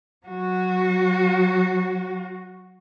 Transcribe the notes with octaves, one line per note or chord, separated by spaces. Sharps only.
F#3 F#4